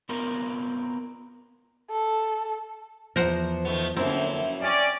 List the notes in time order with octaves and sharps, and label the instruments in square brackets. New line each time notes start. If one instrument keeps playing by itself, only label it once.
[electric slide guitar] B3 C4 F4 A#4
[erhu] A4
[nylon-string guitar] E2 F3 [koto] A#4 C5 F#5
[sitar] D#3 A3 B3
[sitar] F#2 F3 E4 [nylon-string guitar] D3 A#3 A#4 [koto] C4
[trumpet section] C#4 D5 [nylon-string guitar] G5